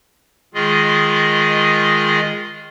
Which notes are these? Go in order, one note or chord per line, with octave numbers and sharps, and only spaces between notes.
D#3 G#3 F4 G#4 D#5